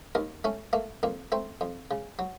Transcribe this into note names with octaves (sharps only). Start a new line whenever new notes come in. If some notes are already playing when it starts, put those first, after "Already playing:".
D#2 A#4
A3 C#4
A3 A#3
F2 A#3
A3 C4
F2
C#3
F#3